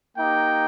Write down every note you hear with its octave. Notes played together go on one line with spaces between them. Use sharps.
A#3 D#4 G4 G5